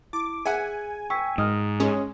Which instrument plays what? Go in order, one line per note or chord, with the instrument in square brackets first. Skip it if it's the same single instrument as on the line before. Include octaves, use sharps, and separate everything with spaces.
[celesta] E4 [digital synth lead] D6
[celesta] G#4 [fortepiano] E5 F#5 [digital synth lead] G#5
[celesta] G5 E6 B6 [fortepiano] C#6
[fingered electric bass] G#2 [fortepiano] D#5 F6 [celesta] D#6
[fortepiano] G#3 [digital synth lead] C#4